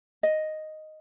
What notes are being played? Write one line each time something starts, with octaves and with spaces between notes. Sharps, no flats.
D#5